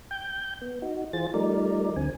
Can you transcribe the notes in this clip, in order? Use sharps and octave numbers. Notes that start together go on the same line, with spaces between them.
G5 G6
B3
D#4 F#4
E3 F4 G#4 C5 A6
F3 G3 A3 D#4 A#4 D5
D2 D3 C4 G#5